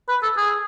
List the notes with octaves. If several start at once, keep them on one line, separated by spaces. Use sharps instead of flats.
B4
A4
G#4